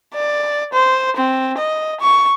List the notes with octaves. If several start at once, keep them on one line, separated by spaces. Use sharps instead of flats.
D5
C5
C4
D#5
C#6